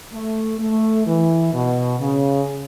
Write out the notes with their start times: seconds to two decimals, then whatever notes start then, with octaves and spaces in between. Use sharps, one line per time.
0.13 A3
0.60 A3
1.07 E3
1.53 B2
2.00 C#3